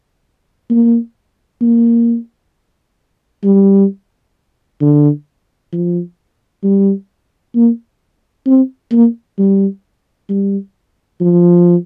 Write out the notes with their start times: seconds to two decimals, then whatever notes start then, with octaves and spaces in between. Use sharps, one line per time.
0.70 A#3
1.61 A#3
3.43 G3
4.81 D3
5.73 F3
6.64 G3
7.55 A#3
8.46 C4
8.92 A#3
9.38 G3
10.29 G3
11.21 F3